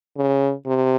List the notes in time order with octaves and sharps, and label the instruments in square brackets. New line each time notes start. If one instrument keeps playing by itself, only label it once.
[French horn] C#3
C3